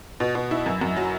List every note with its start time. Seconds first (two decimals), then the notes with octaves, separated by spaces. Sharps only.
0.20 B2
0.35 B2
0.51 E4
0.66 F#2
0.81 F#2
0.96 F#3